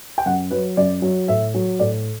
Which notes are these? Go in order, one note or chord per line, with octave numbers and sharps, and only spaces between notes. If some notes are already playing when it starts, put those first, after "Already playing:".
G5
F#2 F#5
F#3 B4
F#2 D5
F#3
A2 E5
F#3
A2 D5